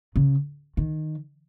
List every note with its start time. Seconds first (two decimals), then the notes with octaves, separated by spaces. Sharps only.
0.16 C#3
0.77 D#3